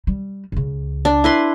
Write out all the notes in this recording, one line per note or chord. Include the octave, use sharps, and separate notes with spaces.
G3
C#2 C#3
D4
E4 B4 C6